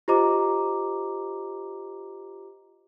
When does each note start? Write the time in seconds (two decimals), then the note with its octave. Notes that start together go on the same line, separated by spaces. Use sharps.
0.08 F4 G4 C5 D#5 A#5 D6